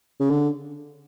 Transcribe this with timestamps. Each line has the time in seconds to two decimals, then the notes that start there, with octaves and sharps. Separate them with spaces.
0.20 C#3
0.31 D3